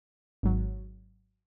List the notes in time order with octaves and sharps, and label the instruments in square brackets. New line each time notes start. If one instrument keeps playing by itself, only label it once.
[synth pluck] G#1 G#2 F#3